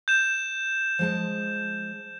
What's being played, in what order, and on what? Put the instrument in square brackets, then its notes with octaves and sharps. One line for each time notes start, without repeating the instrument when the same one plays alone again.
[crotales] G6 E7
[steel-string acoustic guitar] F3 G#3 A5